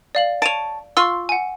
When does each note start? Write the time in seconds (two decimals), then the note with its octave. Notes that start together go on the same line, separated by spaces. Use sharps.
0.15 D5 F5 F#7
0.42 C#5 A5 D7 D#7 F7
0.97 F4 C6 C#6 E6
1.29 F#5 G#5